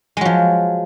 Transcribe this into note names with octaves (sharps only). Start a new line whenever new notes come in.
F3 F#3 G#3